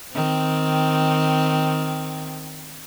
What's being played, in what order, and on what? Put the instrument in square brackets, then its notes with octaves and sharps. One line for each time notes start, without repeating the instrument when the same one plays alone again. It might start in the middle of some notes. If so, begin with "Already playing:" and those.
[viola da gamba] D#3 C4